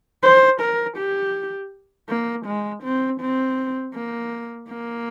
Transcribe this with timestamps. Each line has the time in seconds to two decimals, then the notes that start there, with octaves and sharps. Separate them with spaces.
0.23 C5
0.61 A#4
0.97 G4
2.09 A#3
2.46 G#3
2.84 C4
3.21 C4
3.94 A#3
4.69 A#3